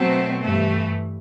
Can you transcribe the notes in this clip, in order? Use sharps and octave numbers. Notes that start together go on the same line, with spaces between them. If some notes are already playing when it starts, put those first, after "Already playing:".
Already playing: B2 F#3 A3 C4
G2 E3 A3